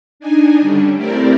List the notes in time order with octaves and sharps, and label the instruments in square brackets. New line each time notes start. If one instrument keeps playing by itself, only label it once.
[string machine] D4 D#4 G#5
D3 G3 C#4 D4
A3 C4 E4 G4 A#4 D5